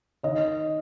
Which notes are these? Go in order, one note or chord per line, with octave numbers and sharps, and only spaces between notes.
D#3 C#5 D#5